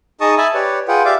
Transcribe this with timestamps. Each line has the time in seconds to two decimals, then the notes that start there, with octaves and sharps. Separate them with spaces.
0.21 D#4 G#4 D#5 A5 C#6 D#6
0.38 E5 G#5 A5 B5
0.54 G4 B4 C#5 D5
0.88 F4 G#4 B4 F#5 G5
1.05 G4 D5 E5 F5 D6